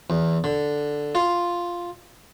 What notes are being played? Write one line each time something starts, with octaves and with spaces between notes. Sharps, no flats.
E2
D3
F4